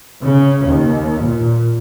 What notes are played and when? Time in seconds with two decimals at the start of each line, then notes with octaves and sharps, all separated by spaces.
0.23 C#3
0.68 D#2
1.24 A#2